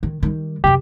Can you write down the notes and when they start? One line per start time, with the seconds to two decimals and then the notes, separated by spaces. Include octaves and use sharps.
0.03 D#3
0.23 D#3 G3
0.64 F#2 C3 G4